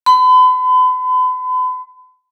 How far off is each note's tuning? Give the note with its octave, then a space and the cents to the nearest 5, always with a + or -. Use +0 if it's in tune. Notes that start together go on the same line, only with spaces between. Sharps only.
B5 +40